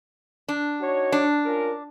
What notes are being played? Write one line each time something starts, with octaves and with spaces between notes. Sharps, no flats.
D4
D#4 F#4 C#5
D4
C#4 F4 A#4